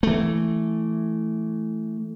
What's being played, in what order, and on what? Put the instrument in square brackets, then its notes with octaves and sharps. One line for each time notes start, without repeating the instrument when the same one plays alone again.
[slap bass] E3 A3